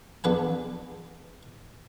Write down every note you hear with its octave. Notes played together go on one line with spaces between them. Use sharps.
E2 D4 B4 G#5